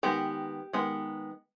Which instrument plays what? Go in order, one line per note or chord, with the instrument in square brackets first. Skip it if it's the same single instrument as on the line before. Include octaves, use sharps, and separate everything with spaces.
[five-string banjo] D#3 G#3 B3 G4
D#3 G#3 B3